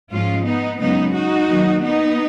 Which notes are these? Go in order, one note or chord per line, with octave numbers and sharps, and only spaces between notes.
G#2 F3 G#3 C#4 F4
B3 D#4
F#2 C#3 G#3 B3 D#4
D#4 F#4
D#2 D#3 F#3
B3 D#4